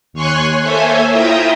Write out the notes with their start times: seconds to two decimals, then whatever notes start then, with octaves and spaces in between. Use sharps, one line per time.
0.13 D#2 C#5 G#5 C6 C#6 F#6
0.62 A#3 A4 C5 C#5 E5 G#5
1.12 E4 F4 E5 G5 A#5 D#6